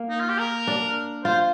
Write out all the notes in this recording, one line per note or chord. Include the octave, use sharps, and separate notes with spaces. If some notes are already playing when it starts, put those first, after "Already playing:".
Already playing: A#3
D#4
F4
G4
A#4
D4
F4 C5